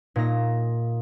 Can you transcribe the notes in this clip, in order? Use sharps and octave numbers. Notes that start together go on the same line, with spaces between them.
A#2 D#4 A#6